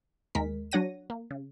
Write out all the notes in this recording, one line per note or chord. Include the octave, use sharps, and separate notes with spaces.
D#2 G#3 A#4 B6
F#3 D4 C#5 F#5 A#6 D#7
A#3
C#3